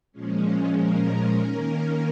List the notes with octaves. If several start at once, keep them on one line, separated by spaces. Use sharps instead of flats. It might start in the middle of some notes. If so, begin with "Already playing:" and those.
A#2 F3 G#3 C#4
A#4
D#3 A#3 C#4